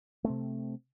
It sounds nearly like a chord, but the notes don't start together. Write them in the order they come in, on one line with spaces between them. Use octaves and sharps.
A3 C4 C3